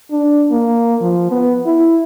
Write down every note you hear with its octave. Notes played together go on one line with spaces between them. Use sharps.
D4
A#3
F3
B3
E4